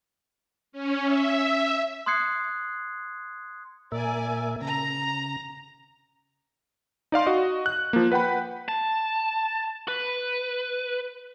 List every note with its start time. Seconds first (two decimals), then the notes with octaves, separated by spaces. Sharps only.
0.72 C#4
1.04 E5
2.06 C6 D#6 F#6 G#6 C7 C#7
3.92 A#2 A#4 D5 E5 G#5
4.62 C#3 A#5
7.12 D#4 D5 F5 C6
7.26 F#4 D#5
7.66 F#6
7.93 F3 A#3
8.12 B4 F#5 G5 B5
8.68 A5
9.88 B4